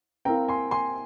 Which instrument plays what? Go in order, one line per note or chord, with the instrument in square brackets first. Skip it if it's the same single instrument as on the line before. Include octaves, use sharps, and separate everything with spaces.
[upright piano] C4 E4 A#4 F5 [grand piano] G5 A#5
[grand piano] G#5 C6
G#5 C6